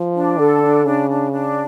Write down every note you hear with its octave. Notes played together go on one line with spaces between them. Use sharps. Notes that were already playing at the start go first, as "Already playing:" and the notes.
Already playing: F3
D4
D3 A4
D4
C#3 D4
D4
D4